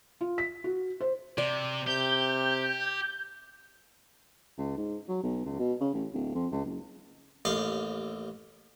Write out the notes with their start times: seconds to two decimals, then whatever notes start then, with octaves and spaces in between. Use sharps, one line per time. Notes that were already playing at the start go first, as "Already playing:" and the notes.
0.21 F4
0.38 B6
0.64 F#4
1.01 C5
1.38 C3 D5
1.87 C3 G4 G6
4.58 C#2
4.77 G#2
5.08 F#3
5.23 B1
5.45 C#2
5.59 B2
5.80 C#3
5.94 A1
6.13 D1
6.35 F2
6.52 C#2
6.64 F#1
7.45 A1 D#2 D#5 F5